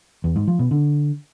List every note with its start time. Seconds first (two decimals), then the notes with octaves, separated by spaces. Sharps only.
0.24 E2
0.36 G#2
0.47 F3
0.59 B2
0.71 D3